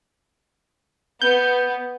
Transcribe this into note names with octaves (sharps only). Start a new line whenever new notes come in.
B3 G6